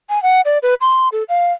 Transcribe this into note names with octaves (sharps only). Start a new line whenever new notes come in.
G#5
F#5
D5
B4
C6
A4
F5